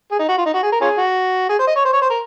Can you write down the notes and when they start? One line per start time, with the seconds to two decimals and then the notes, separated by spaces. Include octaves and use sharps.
0.12 G#4
0.19 D#4
0.29 F#4
0.38 F4
0.46 D#4
0.54 F#4
0.63 G#4
0.72 A#4
0.81 C#4 F4 G#4
0.98 F#4
1.49 G#4
1.59 C5
1.67 D#5
1.76 C#5
1.85 C5
1.93 C#5
2.02 C5
2.10 A#4